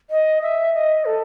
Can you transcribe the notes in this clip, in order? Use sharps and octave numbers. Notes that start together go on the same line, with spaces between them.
D#5
E5
D#5
A4